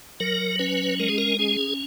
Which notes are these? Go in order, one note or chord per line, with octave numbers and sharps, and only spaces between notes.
F#3 A#4
C#4 B4
G#3 A#4
G#4
A#4
C#4 G#4